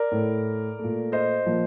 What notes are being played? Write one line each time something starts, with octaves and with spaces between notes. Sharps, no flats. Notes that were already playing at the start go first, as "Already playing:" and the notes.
Already playing: A#4 D5
A2 A3
A#2 A3
C5 D#5
A#2 F3 A#3